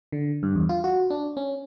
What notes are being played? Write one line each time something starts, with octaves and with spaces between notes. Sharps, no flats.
D3
G2
E2
F4
F#4
D4
C#4